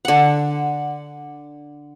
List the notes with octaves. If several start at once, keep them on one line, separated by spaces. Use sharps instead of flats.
D3 F#5